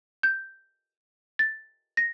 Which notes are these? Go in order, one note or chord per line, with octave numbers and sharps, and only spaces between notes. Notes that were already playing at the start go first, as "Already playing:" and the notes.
G6
A6
A#6